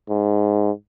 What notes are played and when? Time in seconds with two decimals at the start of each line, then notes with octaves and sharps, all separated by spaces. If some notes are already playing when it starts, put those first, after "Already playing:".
0.09 G#2